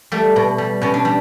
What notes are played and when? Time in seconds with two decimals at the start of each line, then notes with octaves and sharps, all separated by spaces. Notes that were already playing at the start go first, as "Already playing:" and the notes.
0.12 G3 A3
0.36 B2
0.58 G3
0.81 B2 C#4
0.94 D4
1.05 G3